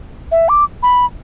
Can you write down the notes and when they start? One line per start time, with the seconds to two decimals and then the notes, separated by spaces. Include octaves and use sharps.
0.32 E5
0.49 D6
0.83 B5